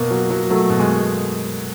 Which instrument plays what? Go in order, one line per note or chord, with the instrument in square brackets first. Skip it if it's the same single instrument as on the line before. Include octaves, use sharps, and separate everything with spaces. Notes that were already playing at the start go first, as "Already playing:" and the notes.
Already playing: [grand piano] B2 A#3
F#3
F#3
F#3 A3
B2
G#3